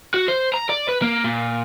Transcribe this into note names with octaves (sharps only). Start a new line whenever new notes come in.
F#4
C5
A#5
D5
B4
A#3
A#2